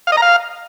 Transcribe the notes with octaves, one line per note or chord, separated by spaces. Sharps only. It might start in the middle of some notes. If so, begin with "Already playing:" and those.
F5
D#5
A#5
F5